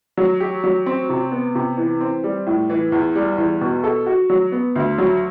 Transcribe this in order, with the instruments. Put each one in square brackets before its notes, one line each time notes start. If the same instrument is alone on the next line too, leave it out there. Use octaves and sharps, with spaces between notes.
[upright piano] F#3
G4
F#3
C4
C3
B3
C3
E3
C4
G3
A2
E3
E2
G3
E2
B2
A4
F#4
F#3
B3
D2
F#3